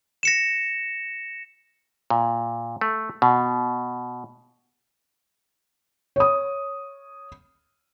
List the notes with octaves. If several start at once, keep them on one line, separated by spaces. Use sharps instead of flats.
A#6 C#7 E7
A#2
A3
B2
C#5 D#6